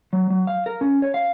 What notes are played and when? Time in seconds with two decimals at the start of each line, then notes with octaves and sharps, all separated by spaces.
0.13 F#3
0.30 F#3
0.47 F5
0.66 A#4
0.81 C#4
1.02 C#5
1.14 F5